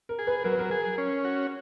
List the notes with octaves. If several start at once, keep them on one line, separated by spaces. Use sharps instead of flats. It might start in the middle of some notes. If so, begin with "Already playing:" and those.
A#4
G#4
B4
F#3 A#4
B4
A#4
G#4
C#4
F#4